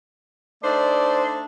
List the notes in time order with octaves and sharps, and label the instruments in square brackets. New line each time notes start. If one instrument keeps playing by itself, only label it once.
[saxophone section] A3 D4 D#4 [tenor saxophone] C5 [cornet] D5